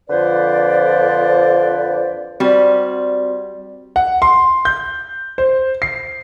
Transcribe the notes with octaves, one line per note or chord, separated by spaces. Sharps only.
F2 D3 F3 B4 C5 D5
G3 C4 F#4 D5
F#5
C6
G6
C5
C7